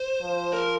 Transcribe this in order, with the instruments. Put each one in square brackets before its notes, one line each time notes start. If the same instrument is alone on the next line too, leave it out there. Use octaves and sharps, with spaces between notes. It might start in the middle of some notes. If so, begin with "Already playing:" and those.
Already playing: [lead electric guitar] C5
[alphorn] F3
[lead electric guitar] A#4